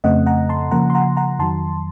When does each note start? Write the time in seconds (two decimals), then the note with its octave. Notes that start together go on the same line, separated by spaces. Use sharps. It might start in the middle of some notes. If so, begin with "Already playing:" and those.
0.04 F2 C#3 A3 C4 D#5 F#5
0.26 F#5 A#5
0.49 A5 C6
0.71 C#3 F3 A#3 F#5 A#5
0.90 C6
0.95 F#5 A#5
1.17 F#5 A#5
1.39 F2 D#3 F#3 A5 C6